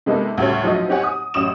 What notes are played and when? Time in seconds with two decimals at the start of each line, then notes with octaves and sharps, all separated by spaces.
0.06 C3 G#3 A#3 B3 D#4 A4
0.38 D2 A2 C#3 G3 C#5
0.64 F3 F#3 D#4 D#5
0.88 C4 D#4 G4 C#5 F#5 G#5
1.03 D#6
1.34 A1 F#2 D#6 E7